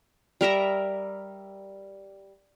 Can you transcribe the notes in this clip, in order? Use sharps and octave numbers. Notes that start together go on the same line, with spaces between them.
G3 A#4 E5 A#5